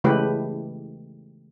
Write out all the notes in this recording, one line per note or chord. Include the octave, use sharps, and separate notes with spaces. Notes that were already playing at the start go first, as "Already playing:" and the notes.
C#3 E3 G#3 A3 G4 B4